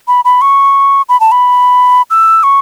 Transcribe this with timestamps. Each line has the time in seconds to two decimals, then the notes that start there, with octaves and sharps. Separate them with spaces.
0.08 B5
0.25 B5
0.41 C#6
1.09 B5
1.20 A5
1.32 B5
2.10 E6
2.43 C#6